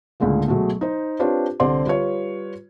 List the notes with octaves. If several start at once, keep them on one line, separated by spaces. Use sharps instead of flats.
C#2 A2 D3 G#3 A#3
B2 F#3 G#3 A3
D#4 C5
C4 D4 F4 G4 B4 C#5
C2 D3 G3 C4 D5 C6
G3 F4 B4 C#5